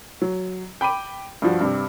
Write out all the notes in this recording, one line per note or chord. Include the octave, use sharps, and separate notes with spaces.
F#3
G5 B5 D6 D#7
G2 F3 F#4
G2 C3